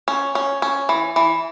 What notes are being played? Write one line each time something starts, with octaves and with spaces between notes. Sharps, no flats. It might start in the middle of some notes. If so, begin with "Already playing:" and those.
C#4
C#4
C#4
E3
E3